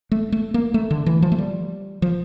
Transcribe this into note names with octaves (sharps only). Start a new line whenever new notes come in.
A3
A3
A#3
A3
D3
E3
F3
A3
G3
F3